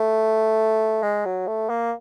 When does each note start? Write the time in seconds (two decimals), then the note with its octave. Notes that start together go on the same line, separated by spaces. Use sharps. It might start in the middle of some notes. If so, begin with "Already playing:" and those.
Already playing: A3
1.03 G#3
1.25 F#3
1.47 A3
1.69 A#3